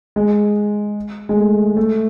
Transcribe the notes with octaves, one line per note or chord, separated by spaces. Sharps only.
G#3
G#3
A3
A3